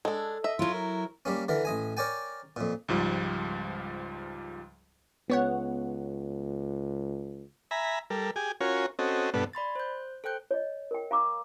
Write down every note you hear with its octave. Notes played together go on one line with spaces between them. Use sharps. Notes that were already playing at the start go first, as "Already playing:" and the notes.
G#3 D4 A4
D#5 E5
F#3 E4 F4
A#4
G3 A#3 C#4
D3 E3 A#4
A1 D#5 G#5
A#4 C#5 D5 G5 G#5
F2 A#2
C#2 G#2 F3 G3
C#2 B3 C#5 F#5
E5 G#5 A#5 B5
G3 A4 A#4
G4 G#4 G#5
C#4 F4 F#4 A#4 C#5 G#5
C4 C#4 F#4 A4 D#5
G2 B2 B3 D4 A4
D5 B5 C6 A6
C5 G6
A4 C5 G5 F#6 G6
C#5 D#5
A#4 G5
F5 A#5 D6 E6